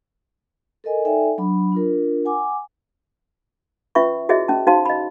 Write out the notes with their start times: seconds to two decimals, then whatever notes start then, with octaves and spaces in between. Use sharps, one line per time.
0.84 A4 A#4 D#5 G#5
1.05 D#4 A4 D5 E5 G5 G#5
1.38 F#3 D4 B5
1.72 D4 F4 A#4
2.25 F#5 G#5 D6
3.95 C#4 F4 B4 E5 B5 C#6
4.29 E4 F#4 G#4 C#5 D#5 E5
4.48 C#4 A5
4.67 D#4 F#4 C5 F5 A5 C6
4.86 D#5 B5